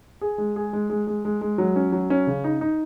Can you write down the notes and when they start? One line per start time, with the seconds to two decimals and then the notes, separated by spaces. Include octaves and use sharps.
0.21 G#4
0.38 G#3
0.56 G#4
0.73 G#3
0.90 G#3
1.07 G#3
1.25 G#3
1.41 G#3
1.58 F#3
1.76 C#4
1.92 F#3
2.10 C#4
2.27 C#3
2.44 D#4
2.61 D#4